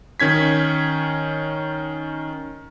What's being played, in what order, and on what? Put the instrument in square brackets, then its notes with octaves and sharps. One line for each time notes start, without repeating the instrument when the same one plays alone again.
[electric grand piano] D#3 C#4 G#6 B6